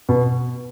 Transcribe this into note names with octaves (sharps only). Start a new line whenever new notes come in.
B2